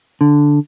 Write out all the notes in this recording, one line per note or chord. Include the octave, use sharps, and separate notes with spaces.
D3